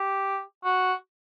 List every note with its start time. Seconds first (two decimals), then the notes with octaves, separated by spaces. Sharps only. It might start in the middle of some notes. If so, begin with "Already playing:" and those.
Already playing: G4
0.64 F#4